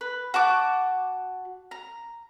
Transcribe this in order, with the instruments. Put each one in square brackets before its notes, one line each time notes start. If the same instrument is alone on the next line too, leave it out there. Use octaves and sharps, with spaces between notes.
[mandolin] B4
F#4 A5 D6
A#5